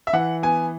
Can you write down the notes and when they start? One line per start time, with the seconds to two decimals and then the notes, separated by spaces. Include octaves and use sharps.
0.07 E5
0.13 E3 F#5
0.43 B3 G#5